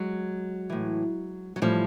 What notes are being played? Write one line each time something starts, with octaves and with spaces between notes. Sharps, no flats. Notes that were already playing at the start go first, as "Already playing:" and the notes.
Already playing: F#3 G#3
A2 E3
F#3
A2 E3 F3 G3